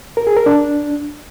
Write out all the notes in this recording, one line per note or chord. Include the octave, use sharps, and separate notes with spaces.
A#4
G#4
A#4
D4